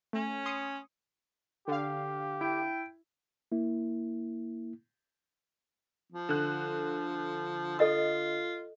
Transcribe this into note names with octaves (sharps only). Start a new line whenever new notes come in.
A3 C#4
C6 D#6 C#7
D3 G4 F5
E4 G5
A#3 E4
F3
D3 F#6
F4 A4 D#5 D#6